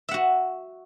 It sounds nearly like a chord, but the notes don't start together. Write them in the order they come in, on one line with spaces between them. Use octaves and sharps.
E5 F#5 F#4